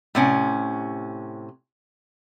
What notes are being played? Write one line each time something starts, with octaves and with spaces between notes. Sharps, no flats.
A2 C3 C#4